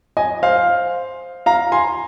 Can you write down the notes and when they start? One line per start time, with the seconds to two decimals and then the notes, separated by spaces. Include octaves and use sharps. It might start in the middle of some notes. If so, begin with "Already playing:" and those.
0.17 D#5 G#5
0.43 C5 F5
1.46 F5 A#5
1.72 G#5 C6